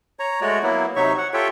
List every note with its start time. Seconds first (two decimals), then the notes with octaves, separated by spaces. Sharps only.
0.19 C#5 A#5
0.41 G#3 A3 F#4 C#5 D5
0.63 F#3 A#3 B3 E4
0.96 C3 F#3 D#4 C#5 E5 C#6
1.18 F#5
1.34 F4 G4 A4 C#5 E5 G5